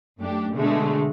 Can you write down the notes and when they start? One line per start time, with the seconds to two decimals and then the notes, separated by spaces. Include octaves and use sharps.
0.18 F#2 A3 D4 G4
0.53 B2 D3 G#3 A3